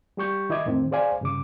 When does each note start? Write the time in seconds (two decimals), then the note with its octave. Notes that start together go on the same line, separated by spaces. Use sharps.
0.17 G3 G4 C#6 G6
0.49 D#3 E4 D#5 D6 G#6
0.66 F2 A2 D#3 C4
0.91 G#4 C5 D5 F5 G#5
1.21 G2 C#3 D6